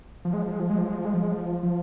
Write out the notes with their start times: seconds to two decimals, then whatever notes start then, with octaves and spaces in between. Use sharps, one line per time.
0.25 F3
0.33 G#3
0.42 F3
0.51 G#3
0.60 F3
0.69 G#3
0.78 F3
0.87 G#3
0.96 F3
1.05 G#3
1.14 F3
1.23 G#3
1.32 F3
1.63 F3